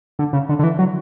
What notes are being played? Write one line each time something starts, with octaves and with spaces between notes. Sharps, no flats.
D3
C#3
D3
D3
E3
F#3